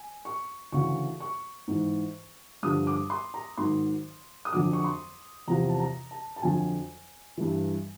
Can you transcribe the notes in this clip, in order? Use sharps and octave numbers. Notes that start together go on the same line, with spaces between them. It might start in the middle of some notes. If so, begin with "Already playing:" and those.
Already playing: G#5
C#6
D2 C#3 E3 C#6
C#6
G#2 E3
G2 D3 F3 D#6
D6
C6
A#5
G#2 D#3 F#3 C6
D#6
F2 D3 F#3 D6
C#6
C6
E2 C3 F3 A#5
A5
A#5
A5
A5
F2 D3 F#3 G#5
G2 E3